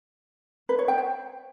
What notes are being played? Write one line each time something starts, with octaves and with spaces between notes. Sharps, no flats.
B4
C#5
G5
C5